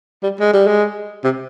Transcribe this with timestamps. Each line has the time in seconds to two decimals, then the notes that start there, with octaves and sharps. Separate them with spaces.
0.23 G3
0.40 G#3
0.53 G3
0.67 G#3
1.24 C3